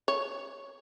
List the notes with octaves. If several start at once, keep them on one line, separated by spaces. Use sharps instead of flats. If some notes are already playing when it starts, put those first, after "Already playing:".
C#5